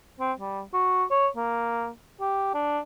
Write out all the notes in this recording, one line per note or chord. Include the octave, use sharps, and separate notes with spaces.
C4
G3
F#4
C#5
A#3
G4
D4